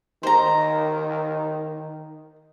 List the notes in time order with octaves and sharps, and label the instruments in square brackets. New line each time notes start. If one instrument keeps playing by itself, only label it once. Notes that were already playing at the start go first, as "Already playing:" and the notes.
[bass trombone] D#3 [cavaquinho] C5 A#5